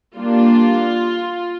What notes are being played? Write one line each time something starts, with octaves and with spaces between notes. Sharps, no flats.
G3 A#3 D4 F4